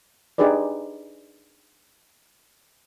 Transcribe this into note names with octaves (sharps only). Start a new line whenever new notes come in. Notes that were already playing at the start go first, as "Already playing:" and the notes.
D4 D#4 G4 G#4 B4 D5